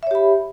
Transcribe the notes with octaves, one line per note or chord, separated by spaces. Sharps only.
G4 C#5 E5 B5